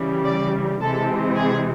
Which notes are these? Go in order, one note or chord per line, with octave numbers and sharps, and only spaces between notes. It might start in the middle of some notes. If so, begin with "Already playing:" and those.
Already playing: C#3 E3 G3
D5
C3 E3 G#3 C4 A4
G#4